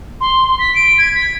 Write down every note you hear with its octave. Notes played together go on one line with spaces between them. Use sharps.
C6
B6
D7
G#6
B6